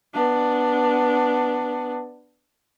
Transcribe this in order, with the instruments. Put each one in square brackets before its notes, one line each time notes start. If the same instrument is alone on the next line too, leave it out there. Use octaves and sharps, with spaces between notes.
[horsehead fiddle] B3 D4